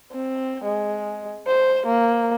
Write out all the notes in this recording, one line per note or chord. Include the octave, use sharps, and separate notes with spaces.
C4
G#3
C5
A#3